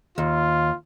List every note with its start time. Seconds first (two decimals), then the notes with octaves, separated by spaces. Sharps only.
0.18 D#2 F4